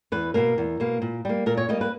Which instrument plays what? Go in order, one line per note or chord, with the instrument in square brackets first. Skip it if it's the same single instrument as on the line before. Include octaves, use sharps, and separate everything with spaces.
[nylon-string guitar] E2 B4
B2 A#3 A#4
E2
B2 A#3
A#2
G3 A#3
A#2 A#4
C#5
G3 A#3 D#5
B4